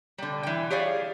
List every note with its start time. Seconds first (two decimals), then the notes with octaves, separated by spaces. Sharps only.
0.18 D3 G3
0.43 E3 G5
0.70 G4 G#4 C#5 D5 F5